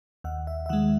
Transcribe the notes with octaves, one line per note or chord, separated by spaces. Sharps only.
D#2 F#5
E5
E5
D#3 G#3 F#5